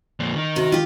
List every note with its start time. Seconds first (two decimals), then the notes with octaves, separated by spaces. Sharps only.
0.20 F2 A#2
0.36 D#3 D#4
0.56 C3 F#4
0.72 F4 G4